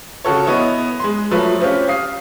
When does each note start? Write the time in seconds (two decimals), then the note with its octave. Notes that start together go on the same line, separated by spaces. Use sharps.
0.25 C#3 F#4 A4 C#5
0.47 B3 E4 C#5 D#5
1.00 G#3 C6
1.31 F3 F#3 A3 B4
1.61 C4 C#4 F4 G4
1.88 F5 D#6 C7